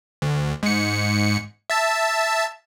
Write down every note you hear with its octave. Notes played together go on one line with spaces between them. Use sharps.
D2
G#2 C#7
E5 A5